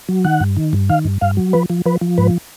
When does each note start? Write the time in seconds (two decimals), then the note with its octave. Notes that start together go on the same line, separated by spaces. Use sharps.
0.09 F#3
0.25 D#3 F#5
0.40 G2
0.57 D#3
0.73 G2
0.89 D#3 F5
1.05 G2
1.21 G2 F5
1.37 F#3
1.53 F3 B4
1.70 F3
1.86 F3 B4
2.01 F3
2.18 G#2 B4